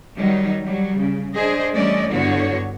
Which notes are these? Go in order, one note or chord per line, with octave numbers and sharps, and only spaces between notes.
D#3 F#3 G3 D#4
F#3 G3
C#3
D4 G#4 C5 D#5
E3 G3 A3 C#4 D5 D#5
G2 D3 B3 E4 F#4 C#5